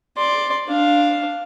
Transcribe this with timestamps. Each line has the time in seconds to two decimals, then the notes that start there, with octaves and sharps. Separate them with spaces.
0.17 D5 C6
0.68 D4 F5